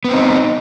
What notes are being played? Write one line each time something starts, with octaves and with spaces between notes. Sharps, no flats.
B3 C4 D#4